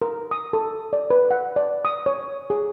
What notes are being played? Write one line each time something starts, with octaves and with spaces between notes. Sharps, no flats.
A#4
D#6
A4
D5
B4
F#5
D5
D#6
C#5
G#4